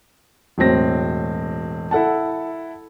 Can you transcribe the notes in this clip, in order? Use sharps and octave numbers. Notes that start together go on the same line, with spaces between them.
E1 A2 F#3 C4 A#6
E4 A4 F#5 A5